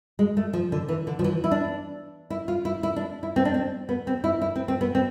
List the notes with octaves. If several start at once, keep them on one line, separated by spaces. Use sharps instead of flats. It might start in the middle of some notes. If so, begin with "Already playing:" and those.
G#3
A3
F3
D3
E3
D3
F3
E3
E4
D4
E4
F4
E4
E4
D4
E4
C4
D4
C4
B3
C4
E4
E4
C4
C4
B3
C4